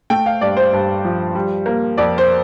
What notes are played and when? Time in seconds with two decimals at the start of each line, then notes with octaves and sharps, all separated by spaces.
0.10 A3 G5
0.26 F5
0.41 G2 D5
0.57 C5
0.73 G2
1.05 F3
1.35 G3
1.66 A#3
1.98 F2 D5
2.18 C5